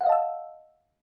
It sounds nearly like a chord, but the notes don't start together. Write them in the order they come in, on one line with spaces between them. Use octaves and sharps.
F#5 F5 D#5 A5 E6